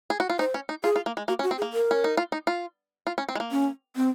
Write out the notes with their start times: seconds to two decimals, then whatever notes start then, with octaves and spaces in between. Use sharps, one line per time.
0.10 G#4
0.20 F#4
0.30 F4
0.39 D#4 C5
0.54 C#4
0.69 D#4
0.84 F4 G#4
0.96 F4
1.06 A#3
1.17 G#3
1.28 A#3 F#4
1.39 C#4
1.43 F#4
1.51 C4
1.58 G#4
1.62 A#3
1.73 A#4
1.91 C#4
2.04 D#4
2.17 F4
2.32 D#4
2.47 F4
3.07 F4
3.18 C#4
3.29 C4
3.35 G#3
3.40 A#3
3.51 C#4
3.96 C4